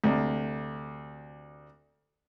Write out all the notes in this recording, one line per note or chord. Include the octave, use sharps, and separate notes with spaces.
D2 C3